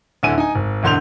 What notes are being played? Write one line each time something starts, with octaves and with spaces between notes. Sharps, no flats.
D1 D3 E4 G#5 D#7
D#4 G#5
G#1
E1 E2 D3 C6 G6 F7